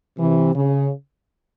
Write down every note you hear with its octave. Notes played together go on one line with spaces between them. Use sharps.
C3 E3
C#3